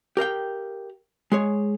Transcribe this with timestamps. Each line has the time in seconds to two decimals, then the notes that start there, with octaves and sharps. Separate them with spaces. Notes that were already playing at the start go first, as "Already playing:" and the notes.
0.17 G4 A#4 F5 G5
1.32 G#3 G#4 C#5